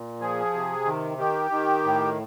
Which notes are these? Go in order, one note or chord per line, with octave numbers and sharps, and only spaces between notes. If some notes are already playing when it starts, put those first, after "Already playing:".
Already playing: A#2
F3 G#4
C3
D#3
D#3 G4
D#3
A2